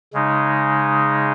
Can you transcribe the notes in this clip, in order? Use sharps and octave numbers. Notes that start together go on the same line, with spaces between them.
C#3 G#3 D#4